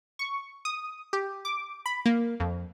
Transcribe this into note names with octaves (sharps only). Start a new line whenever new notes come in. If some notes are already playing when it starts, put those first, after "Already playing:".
C#6
D#6
G4
D6
B5
A#3
F2